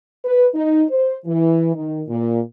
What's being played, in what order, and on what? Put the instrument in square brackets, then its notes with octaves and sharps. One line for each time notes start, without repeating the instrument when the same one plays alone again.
[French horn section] B4
D#4
C5
E3
D#3
A#2